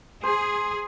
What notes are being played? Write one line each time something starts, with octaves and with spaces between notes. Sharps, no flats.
G#4 C5